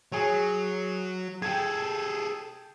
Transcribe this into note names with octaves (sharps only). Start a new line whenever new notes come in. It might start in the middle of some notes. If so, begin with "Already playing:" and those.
F#3 G#4 C#5
G#4 A4 G5 A5 G#6